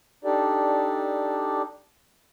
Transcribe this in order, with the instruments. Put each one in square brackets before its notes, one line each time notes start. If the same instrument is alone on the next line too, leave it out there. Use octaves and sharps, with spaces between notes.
[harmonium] D4 D#4 G4 A4 D5